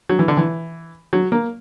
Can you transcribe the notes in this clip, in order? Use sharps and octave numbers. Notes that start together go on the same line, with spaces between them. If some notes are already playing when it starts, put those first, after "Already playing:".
F#3
E3
D3
E3
F#3
A#3